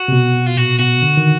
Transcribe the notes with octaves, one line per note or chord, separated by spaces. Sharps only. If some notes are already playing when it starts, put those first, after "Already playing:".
Already playing: F#4
C3
B2
F4
A#2 F#4
B2 F#4
D3
D#3